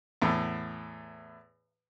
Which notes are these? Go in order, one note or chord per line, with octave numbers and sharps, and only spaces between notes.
E2 A2